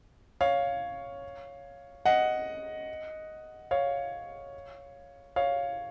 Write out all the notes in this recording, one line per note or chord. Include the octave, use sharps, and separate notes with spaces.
C#5 F5
D#5 F#5
C#5 F5
C#5 F5